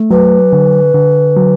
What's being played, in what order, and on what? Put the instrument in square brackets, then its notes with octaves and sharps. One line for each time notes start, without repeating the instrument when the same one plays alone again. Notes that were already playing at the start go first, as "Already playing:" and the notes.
Already playing: [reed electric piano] A3
[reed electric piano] F#3 [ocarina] B4
[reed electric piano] D3
D3
F#3